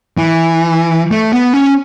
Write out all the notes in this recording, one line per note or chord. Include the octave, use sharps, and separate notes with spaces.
E3
A3
B3
C#4